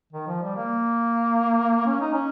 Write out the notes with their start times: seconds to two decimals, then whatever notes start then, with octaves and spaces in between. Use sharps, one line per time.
0.13 D#3
0.27 F3
0.42 G3
0.56 A#3
1.86 C#4
2.01 D#4
2.13 C#4